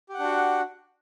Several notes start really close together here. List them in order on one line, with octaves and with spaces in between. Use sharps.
G4 F#5 D4 F#4